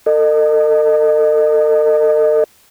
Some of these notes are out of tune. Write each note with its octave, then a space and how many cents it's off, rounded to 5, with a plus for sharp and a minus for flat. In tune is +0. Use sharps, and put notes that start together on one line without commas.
A4 +40 D#5 -30